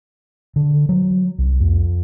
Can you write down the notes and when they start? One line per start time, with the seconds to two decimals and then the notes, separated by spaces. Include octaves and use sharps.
0.56 D3
0.89 F#3
1.38 C2
1.60 F2